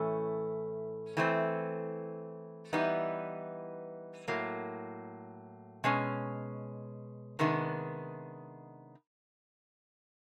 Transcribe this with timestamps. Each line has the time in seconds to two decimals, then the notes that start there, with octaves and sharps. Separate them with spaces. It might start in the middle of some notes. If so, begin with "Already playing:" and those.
Already playing: A2 E3 A3 C#4
1.17 E3 A3 C4
2.73 E3 G3 B3 D#4
4.28 A2 F#3 A#3
5.84 B2 G#3 C#4
7.39 C3 D#3 G#3 B3 D4